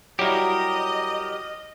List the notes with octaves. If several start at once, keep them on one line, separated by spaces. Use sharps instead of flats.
F#3 G3 E4 G4 A#4 D#5